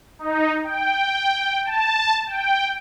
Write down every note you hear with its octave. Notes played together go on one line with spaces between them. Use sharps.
D#4
G5
A5
G5